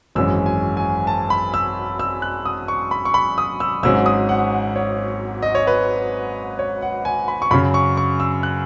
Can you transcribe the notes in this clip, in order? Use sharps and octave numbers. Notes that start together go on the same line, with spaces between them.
G#1 F#2 E3 G#3 C#4 E6
G#5
G#5
A5
B5
E6
E6
F#6
D#6
C#6
B5
C#6
B5
D#6
E6
G#1 G#2 F#3 C#4 E6
D#6
F#5
C#5
D#5
C#5
B4
C#5
F#5
G#5
B5
C#6
F#2 C#3 F#3 B5
C#6
C#6
E6
F#6